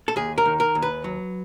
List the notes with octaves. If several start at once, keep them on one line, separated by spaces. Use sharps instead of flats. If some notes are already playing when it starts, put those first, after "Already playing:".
A4
D#2 G#4
A#4
D#3
A#4
D#2
B4
F#3